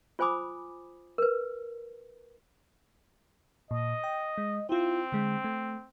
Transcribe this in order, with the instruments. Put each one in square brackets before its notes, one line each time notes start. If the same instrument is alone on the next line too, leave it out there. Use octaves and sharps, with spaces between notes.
[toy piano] F4 C5 G#5 B5 D6 D#6
A#4 B4
[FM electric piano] A#2 [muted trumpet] D#5
[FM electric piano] G5
G#3
[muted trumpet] C4 [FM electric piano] E4 F4
[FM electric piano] D3 G#3
A3